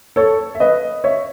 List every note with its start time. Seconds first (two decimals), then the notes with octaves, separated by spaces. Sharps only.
0.16 A4 C#5
0.55 E5
0.60 B4 D#5
1.04 C#5 E5